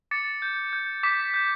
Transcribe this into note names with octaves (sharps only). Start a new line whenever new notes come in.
D6 A6 C#7
G6
G6
D6 B6
G6